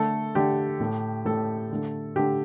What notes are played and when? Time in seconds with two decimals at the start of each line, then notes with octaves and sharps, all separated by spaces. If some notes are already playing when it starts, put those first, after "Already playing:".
Already playing: D3 A3 A4
0.35 D3 A3 G4
0.80 A2 A3
1.25 A2 A3 A4
1.71 D3 A3
2.16 D3 A3 G4